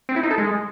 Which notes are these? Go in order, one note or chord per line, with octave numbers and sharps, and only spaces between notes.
C4
E4
D#4
A4
G#3